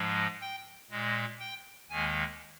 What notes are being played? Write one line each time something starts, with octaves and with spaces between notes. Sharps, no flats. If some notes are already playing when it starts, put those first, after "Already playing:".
Already playing: G#2 F3 G#3
G5
A#2 G#3
G5
D#2 D#3 G#3 G#5